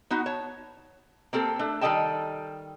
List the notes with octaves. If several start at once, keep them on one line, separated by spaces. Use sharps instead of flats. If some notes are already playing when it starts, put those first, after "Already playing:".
B3 D#4 F#4
C#5 A5
A#3 C4 G4 A4
A3 D4
D#3 G3 A4 D#5 G5 A5